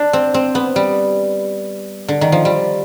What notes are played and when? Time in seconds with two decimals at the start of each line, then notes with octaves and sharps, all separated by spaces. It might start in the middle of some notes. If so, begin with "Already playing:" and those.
Already playing: D4
0.13 C4
0.34 C4
0.55 B3
0.76 G3
2.08 D3
2.21 D#3
2.32 F3
2.45 G3